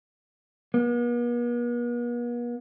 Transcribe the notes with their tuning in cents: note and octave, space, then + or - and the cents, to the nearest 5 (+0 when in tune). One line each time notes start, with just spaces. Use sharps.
B3 -45